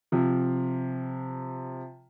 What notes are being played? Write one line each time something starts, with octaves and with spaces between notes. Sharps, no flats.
C3 F3